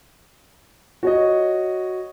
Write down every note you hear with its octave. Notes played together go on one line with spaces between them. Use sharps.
F#4 C#5 D#5